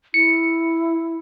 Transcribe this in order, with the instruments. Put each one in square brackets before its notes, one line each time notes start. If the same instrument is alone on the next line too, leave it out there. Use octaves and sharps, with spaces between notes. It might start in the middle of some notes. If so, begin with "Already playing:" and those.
[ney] E4 [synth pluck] C#7